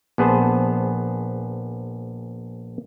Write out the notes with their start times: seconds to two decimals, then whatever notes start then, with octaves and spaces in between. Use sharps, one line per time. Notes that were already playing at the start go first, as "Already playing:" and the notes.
0.18 A#1 B3 G#4 C5 A5